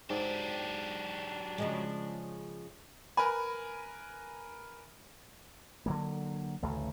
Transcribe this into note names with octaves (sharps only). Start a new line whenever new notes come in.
G#2 F#3 D4 G4
C#3 F3 G#3
A#4 B4 G#5 B5
D3 F#3 A#3
A1 D2 C#3 A3